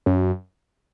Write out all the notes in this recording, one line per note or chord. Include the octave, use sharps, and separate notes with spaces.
F#2